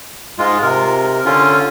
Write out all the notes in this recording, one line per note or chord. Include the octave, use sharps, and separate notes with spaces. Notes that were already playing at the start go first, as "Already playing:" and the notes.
G#2 G#3 F4
C3 A#4
D3 C#4 F4